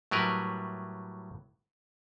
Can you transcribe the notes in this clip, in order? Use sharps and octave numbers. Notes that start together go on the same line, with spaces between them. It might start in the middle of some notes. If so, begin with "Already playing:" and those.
A2 F#3 G3 A#4 B4